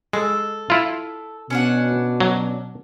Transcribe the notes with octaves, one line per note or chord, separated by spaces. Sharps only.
G#3 A4
E4 F4
B2 C#4 D4 F#5
F#3